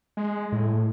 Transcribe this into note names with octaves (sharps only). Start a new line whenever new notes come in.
G#3
A2